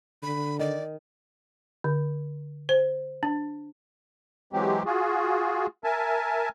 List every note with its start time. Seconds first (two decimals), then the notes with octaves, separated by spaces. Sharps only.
0.23 D3 B5
0.59 D#3 D5
1.84 D3
2.69 C5
3.23 D4
4.53 E3 F#3 G#3 C4 G4
4.86 F4 F#4 G#4
5.84 A#4 E5 G#5 A5